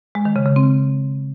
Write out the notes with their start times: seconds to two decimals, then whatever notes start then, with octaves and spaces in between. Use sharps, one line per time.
0.15 G#3
0.25 D#3
0.36 C#3
0.46 C#3
0.56 C4